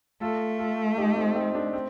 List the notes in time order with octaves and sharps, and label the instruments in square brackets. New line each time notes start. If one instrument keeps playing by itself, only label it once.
[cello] A3 [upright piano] F4 A4
[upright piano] F4 A4
D#4 G4
C4 D#4
C4 D#4
D4
C4